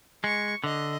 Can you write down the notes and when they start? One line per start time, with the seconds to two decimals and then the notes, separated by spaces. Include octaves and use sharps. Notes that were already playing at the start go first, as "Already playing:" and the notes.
0.24 G#3 C#6
0.64 D3 D#5